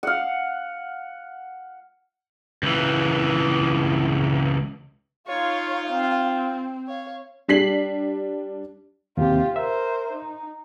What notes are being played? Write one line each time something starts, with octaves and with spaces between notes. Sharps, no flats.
F5 F#5
C#2 E3
D#4 F4 C#5 F5
C4
C#5 F5
G3 D4 B6 C7 F#7
D#2 C3 F4 G4
A#4 C5 E5
D#4